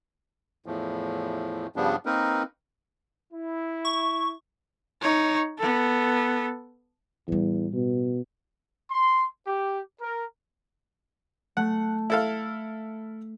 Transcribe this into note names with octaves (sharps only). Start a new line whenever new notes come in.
E2 A2 F3
G2 C#3 F3 G3 B3 D4
A#3 C4 D#4 A#4 B4
E4
C#6
D#4 C#5
B3 A4
E2 A2 G3
B2
C6
G4
A#4
A3 F#5
E4 A4 F5